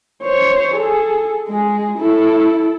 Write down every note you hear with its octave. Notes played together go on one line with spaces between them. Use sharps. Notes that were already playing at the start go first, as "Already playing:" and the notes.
C5 C#5
G#4 A4
G#3 G#4
E4 A4